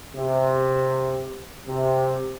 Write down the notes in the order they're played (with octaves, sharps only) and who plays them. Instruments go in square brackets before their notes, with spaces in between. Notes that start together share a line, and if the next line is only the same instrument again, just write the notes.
[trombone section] C3
C3